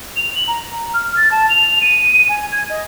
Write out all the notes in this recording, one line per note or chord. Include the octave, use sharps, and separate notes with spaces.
F7
F#7
A#5
F6
A6
A5
F7
D#7
G#5
G#6
D#5